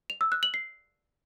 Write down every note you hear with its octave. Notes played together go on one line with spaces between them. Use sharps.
F7
E6
F#6
F#7
C7